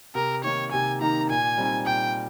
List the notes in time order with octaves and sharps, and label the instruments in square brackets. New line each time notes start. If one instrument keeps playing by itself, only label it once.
[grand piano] C3 [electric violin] A#4
[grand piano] D#3 A#3 D#4 [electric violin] C#5
[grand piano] C3 [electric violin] G#5
[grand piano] D#3 A#3 D#4 [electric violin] A#5
[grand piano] A#2 [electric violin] G#5
[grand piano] G3 C4 D#4
[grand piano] A#2 [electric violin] G5